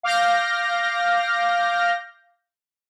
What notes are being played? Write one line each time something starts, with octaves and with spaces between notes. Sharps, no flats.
F5 D6 F6 G6 A#6